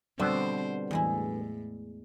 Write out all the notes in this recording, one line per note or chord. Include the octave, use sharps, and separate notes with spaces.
B2 D3 G3 B3 C4 C5 E5
E2 A2 G#3 E4